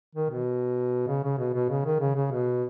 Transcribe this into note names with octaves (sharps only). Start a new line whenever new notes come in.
D#3
B2
C#3
C#3
B2
B2
C#3
D#3
C#3
C#3
B2